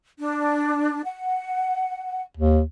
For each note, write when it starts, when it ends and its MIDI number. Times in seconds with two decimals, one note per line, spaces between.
0.18 1.01 62
1.06 2.22 78
2.37 2.61 39